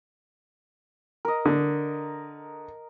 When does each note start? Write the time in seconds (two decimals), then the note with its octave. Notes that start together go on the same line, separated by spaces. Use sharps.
1.25 A#4 D#5
1.45 D3